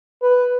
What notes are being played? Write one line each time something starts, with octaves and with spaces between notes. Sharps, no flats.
B4